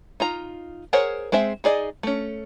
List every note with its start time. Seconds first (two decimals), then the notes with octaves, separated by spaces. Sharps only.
0.20 D#4 F4 A#5
0.93 G#4 A#4 C5 C#5 F#5
1.32 G#3 C4 C5 E5
1.64 D#4 G#4 D5 D#5
2.03 A3 C#4